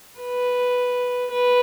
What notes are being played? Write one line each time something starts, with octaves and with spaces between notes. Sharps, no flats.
B4
B4